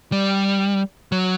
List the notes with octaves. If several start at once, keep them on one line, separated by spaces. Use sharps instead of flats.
G3
F#3